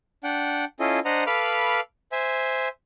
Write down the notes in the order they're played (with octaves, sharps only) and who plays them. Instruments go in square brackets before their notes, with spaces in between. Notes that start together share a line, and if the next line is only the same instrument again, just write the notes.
[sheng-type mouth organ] D4 F#5 G5
C#4 E4 F4 A4 D#5
D4 C5 D#5 F#5 A#5
A4 B4 F5 B5 D6 F6
C5 E5 G#5